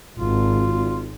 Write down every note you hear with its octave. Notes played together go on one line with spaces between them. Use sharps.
G#1 F4